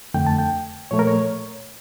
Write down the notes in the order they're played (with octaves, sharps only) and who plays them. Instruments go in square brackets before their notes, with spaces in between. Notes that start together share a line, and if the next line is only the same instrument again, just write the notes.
[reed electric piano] F2 D3 A3 G5
A5
G5
A#2 F3 A3 C#5
A#4
C#5